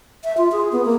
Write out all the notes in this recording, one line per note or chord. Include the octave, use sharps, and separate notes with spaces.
E5
F4
G#4
B3
A#3